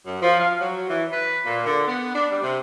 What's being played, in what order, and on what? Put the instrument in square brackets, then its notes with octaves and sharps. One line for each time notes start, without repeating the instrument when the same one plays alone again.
[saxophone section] F#2
F3
F5
F#3
E3
B4
A#2
D3
B3
D4
G3
C3